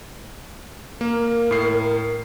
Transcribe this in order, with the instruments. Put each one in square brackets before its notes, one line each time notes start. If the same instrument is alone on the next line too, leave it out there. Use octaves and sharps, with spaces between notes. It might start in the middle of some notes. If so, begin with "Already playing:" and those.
[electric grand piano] A#3 [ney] A#4
[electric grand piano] A2 C7